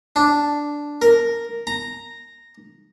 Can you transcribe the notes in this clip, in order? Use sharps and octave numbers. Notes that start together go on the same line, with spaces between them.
D4
A#4
A#5